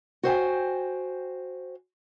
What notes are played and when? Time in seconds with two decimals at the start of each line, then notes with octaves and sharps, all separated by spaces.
0.23 F#4 C5 G5 G#5